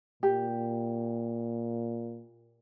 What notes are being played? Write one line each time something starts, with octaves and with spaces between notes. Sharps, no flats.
A#2 G4